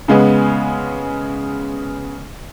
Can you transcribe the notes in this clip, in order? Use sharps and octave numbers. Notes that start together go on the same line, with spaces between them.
C#3 G#3 B3